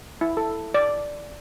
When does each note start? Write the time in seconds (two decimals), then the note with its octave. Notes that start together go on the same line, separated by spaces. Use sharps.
0.21 E4
0.37 A4
0.74 D5